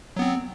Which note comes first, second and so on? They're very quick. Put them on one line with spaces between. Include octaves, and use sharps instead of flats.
F#3 B3 C4